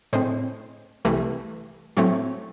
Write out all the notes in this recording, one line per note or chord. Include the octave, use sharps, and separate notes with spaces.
A2 G#3 C4 C5
C2 C3 E3 A3
A2 F#3 A3 C4 C#5